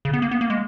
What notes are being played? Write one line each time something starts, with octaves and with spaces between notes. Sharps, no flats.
C#3
B3
A#3
B3
A#3
G#3